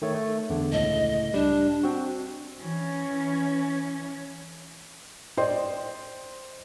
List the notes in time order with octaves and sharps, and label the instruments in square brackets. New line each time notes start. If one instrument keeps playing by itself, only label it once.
[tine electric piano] D#3 A3 C#5
A3
E2 D3
[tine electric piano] C#2 A2 [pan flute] D#5
[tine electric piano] G3 [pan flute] D4
[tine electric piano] C4 F#4
[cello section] E3 C#4
[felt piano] C5 D5 D#5 G5 C6